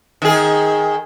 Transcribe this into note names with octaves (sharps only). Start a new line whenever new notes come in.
D#3 G#4